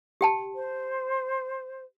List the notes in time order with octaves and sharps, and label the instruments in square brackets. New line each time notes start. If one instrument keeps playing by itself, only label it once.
[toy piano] G4 G5 A5
[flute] C5